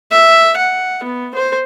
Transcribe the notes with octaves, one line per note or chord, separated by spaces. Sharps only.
E5
F#5
B3
C5